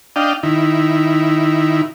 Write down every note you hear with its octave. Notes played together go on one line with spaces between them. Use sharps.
D4 D#5 F5 G5
D#3 E4